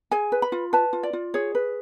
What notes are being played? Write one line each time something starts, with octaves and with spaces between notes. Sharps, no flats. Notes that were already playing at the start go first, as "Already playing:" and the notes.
G#4 G#5
B4
B5
F4
B4 A5
F4
D5
F4
G#4 C#5
B4